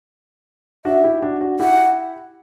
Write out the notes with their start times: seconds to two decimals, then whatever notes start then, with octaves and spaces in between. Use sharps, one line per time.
0.85 D4 F#4 E5
1.04 E4 G4
1.22 D4 F#4
1.41 D4 F#4
1.60 E4 G4 F#5